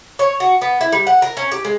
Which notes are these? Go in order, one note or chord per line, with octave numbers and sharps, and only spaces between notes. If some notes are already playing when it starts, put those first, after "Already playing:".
C#5
F#4
B3
E4
G3
F#5
A#4
C#4
G4
G#3